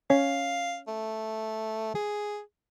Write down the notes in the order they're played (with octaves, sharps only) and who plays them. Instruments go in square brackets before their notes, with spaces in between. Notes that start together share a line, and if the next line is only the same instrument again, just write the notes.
[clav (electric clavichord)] C#4 [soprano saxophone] F5
[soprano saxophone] A3
G#4